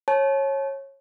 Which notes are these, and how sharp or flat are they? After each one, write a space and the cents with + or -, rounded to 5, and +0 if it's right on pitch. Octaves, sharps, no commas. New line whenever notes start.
C#5 -20 A5 -35